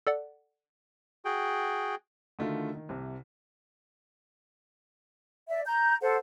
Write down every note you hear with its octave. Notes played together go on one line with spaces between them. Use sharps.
A4 D5 F#5
F#4 G#4 G5
D3 D#3 A3 D4 F4 F#4
D#3
C2 C3
D5 E5
A#5 G6
A4 C5 F#5